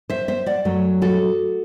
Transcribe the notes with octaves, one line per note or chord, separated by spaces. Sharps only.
C5 E5
C5 E5
D5 F#5
F#2 F#3 A3
F#4 A4